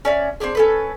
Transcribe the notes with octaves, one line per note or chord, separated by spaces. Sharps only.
C#4 D5 E5
C4 D4 G4 G#4
C#4 A4 B4